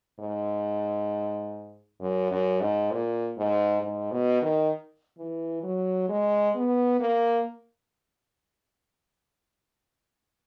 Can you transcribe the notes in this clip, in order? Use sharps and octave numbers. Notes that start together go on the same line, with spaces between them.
G#2
F#2
F#2
G#2
A#2
G#2
G#2
B2
D#3
E3
F#3
G#3
B3
A#3